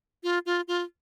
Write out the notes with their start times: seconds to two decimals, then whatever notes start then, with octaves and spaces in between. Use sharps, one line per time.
0.23 F4
0.46 F4
0.68 F4